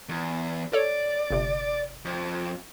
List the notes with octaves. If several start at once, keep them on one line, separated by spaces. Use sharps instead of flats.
E2
A4 C#5 D5
G1 C3
F2